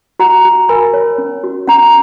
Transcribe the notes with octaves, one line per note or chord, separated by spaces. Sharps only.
F#4 F#5 A#5
F#4
A#4 G#5 B5
C#5
C#4
F#4
C#4 F#5 A#5